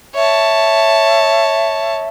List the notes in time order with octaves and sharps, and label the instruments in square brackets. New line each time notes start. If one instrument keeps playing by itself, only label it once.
[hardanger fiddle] C#5 A5 [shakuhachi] E5